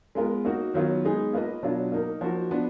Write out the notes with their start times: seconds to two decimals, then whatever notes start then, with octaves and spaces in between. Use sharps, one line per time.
0.15 G#3 B3 F4 A#4
0.45 A#3 D#4 F#4
0.74 D#3 F#3 B3 F4
1.04 G#3 B3 D#4 G#4
1.33 A#3 F4 B4 D#5
1.63 B2 F#3 D4 F4
1.92 A#3 D#4 A#4
2.21 F3 A#3 D#4 F#4
2.51 F3 B3 D4